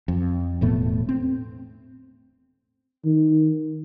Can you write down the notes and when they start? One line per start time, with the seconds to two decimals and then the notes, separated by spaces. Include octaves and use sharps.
0.08 F2
0.61 E1 A2 A3 B3
1.09 C4
3.05 D#3